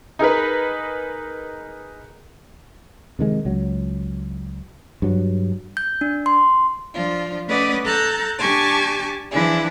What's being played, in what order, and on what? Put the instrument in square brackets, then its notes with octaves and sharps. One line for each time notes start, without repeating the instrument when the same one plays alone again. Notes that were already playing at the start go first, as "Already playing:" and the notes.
[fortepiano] D#4 G#4 A#4 B4
[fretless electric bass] C3 D#3 G#3
C#2 F#3
G2 F#3
[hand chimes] G6
D4
C6
[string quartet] F3 D4 F4
A3 C#4 B4 D5 D#5 F#5
A4 A#5 F#6 G6 A6
D4 G4 G#5 A5 C#6 D6
E3 F3 D4 E4 G#4